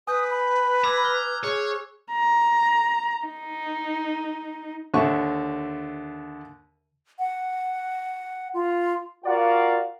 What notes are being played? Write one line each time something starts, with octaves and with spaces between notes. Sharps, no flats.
B4 G#5 D#6 G6
B5
A#5 D6 E6 G#6
F6 F#6 G7
G#4 C#5
A#5
D#4
D#2 D3 E5 C#6
F#5
F4
F4 F#4 A#4 D5 F5 F#5